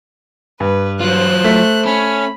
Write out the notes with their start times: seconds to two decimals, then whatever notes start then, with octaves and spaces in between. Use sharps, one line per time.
0.60 G2 B4
1.01 F#3 F4 C5 F#6
1.44 A3 B6
1.86 C#4 B5